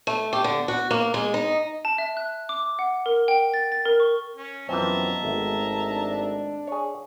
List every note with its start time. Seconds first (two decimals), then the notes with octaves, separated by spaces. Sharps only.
0.07 A3
0.33 G4
0.44 D3
0.68 F#4
0.91 A#3
1.14 G#3
1.34 D#4
1.85 A5
1.98 E5
2.17 F#6
2.49 D6
2.79 F#5
3.06 A#4
3.28 G5
3.54 A6
3.72 A6
3.86 A#4
4.00 C#6
4.36 C#4
4.69 F#2 B2 E3 F3 C4 E5 A5 A#5
5.23 G#1 A3
5.87 D4
6.67 G#4 C#5